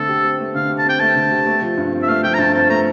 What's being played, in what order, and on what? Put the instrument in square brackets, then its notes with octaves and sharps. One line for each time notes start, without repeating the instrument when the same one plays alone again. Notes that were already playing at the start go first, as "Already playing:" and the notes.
Already playing: [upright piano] D3 A3 C4 [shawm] A4
[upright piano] G4
C4
A3
[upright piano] D3 [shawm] F5
[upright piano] G4
[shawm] A5
[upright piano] C4 [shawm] G5
[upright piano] A3 [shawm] A5
[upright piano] D3
G4
A3
F3
G2
C4
[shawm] E5
[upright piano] A3 [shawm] F5
[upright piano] F3 [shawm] G5
[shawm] A#5
[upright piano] G2 [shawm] A5
[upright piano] C4 [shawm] A5
[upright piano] A3 [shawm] A#5